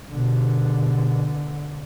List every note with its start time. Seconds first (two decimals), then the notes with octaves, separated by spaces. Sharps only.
0.11 B2 D3